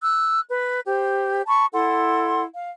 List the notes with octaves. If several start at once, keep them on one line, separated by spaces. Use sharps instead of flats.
E6 F#6
B4
G4 C5
A5 B5 C#6
E4 A4 F#5 C6
F5